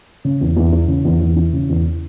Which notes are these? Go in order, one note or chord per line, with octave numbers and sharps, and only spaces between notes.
C#3
E2
E2
E3
C#3
E2
E2
E3
C#3
E2